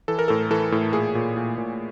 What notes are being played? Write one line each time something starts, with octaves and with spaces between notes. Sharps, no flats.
E3 A4
A#4
A2 A4
E3 A4
A2
A#2 G#4
A#2
A#2
A#2